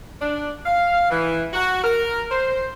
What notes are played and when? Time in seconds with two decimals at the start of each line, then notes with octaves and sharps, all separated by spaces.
0.21 D4
0.66 F5
1.10 E3
1.53 F#4
1.84 A#4
2.31 C5